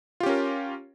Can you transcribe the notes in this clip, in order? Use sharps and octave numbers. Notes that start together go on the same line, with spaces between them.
C#4 F4 G4 A#4